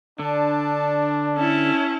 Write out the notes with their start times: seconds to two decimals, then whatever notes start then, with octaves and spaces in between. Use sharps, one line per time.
0.19 D3 D4 D5 A5
1.36 C#4 E4 A4 A5